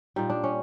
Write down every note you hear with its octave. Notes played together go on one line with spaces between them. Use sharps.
A#2 G3 D#4
D4
C#4